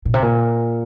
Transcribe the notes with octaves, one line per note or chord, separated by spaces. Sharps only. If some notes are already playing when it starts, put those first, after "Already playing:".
A#2
C3
A#2